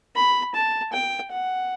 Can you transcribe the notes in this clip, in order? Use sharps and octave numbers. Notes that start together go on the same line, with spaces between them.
B5
A5
G5
F#5